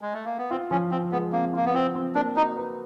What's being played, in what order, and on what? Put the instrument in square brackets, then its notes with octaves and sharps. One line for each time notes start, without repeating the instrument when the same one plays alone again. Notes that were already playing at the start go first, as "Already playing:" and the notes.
[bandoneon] G#3
A3
A#3
B3
[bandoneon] C4 [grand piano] F4
[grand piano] F3 [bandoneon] C#4
[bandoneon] C4 [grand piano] F4
[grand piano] G#3 [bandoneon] B3
[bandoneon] A#3 [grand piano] C4
[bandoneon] A#3 [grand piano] F4
[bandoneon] B3
[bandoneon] C4 [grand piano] F4
[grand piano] C4
[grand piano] A#3 [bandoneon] D4
[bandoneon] D#4 [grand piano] F#4
[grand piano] B4